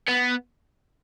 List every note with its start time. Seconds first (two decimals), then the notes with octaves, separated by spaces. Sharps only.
0.08 B3